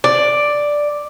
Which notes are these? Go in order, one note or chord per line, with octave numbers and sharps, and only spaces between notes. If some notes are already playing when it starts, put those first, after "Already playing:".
D5